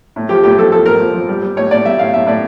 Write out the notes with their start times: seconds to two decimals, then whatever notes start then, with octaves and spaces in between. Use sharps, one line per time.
0.16 A2
0.29 F3 G4
0.43 A2 G4
0.57 F3 A4
0.72 F3 A4
0.86 A2 A#4
1.00 F3
1.14 F3
1.29 G3
1.42 G3
1.56 A2 C#5
1.71 A2 D5
1.85 G3 E5
1.98 A2 F5
2.13 A2 E5
2.26 A2 D5